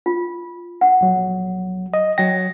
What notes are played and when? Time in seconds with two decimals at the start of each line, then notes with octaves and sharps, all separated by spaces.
0.06 F4
0.81 F#5
1.01 A#1 F#3
1.94 D#5
2.18 F#3 G5 A#6